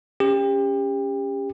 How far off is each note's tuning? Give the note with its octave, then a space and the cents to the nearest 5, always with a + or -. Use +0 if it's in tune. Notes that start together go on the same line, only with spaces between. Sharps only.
C#4 +0 G4 +30